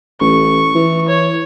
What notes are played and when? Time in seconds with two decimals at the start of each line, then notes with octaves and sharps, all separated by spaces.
0.20 A1 C#6
0.75 E3
1.08 C#5